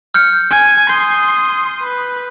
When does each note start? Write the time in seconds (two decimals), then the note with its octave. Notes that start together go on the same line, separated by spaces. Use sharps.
0.14 F6 G6 C#7
0.50 G#5
0.90 C6 D#6 G6
1.82 B4